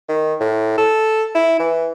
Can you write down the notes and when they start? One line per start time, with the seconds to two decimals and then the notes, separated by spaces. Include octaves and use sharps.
0.09 D#3
0.40 A2
0.78 A4
1.35 E4
1.59 E3